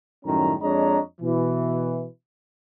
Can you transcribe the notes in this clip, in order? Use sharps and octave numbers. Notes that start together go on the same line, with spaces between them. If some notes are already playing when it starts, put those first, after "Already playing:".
F#2 A2 D#3 G3 C#4 A#5
F2 G#3 D4 C#5 D#5 A#5
B2 E3